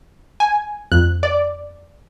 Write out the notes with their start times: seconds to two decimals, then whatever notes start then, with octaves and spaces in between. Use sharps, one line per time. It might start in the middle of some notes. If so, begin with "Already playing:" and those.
0.40 G#5
0.92 F2 F#6
1.23 D5